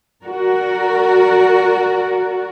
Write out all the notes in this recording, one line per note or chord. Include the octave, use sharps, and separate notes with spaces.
F#4 A#4 D5